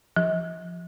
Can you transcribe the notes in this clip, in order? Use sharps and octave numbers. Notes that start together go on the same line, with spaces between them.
F3